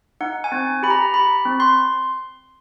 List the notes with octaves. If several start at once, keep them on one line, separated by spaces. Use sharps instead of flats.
D#4 F#5
G#5
C4
G4 B5
A#5
G4 B5
C4
C6